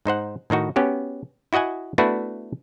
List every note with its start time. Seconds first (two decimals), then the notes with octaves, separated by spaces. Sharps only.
0.06 G#2 D#4 C5 F#5
0.50 A2 D#3 D#4 F#4
0.76 B3 C#4 F#4 G4
1.53 E4 F#4 D#5 F#5 G#5
1.98 A3 B3 D4 E4 F#4 B4